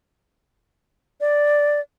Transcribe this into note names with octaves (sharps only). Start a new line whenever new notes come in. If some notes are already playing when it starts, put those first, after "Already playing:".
D5